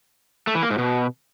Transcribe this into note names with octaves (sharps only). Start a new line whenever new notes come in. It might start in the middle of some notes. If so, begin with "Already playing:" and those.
A3
E3
A#3
G#2
B2